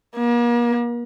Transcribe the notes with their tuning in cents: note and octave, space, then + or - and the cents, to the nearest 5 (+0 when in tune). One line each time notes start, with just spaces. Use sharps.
A#3 +40